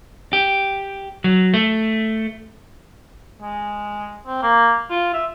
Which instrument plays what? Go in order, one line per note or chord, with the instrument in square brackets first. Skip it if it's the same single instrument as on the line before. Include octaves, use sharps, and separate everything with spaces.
[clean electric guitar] G4
F#3
A3
[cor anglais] G#3
C4
A#3
F4
E5